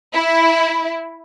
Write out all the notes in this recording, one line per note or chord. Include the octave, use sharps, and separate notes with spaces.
E4